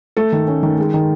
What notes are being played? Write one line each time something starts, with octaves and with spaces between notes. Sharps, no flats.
A3 A4
D#3
C#4
D#3
G#3
D#3